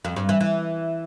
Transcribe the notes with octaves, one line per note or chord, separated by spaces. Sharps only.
F2
G2
E3
E3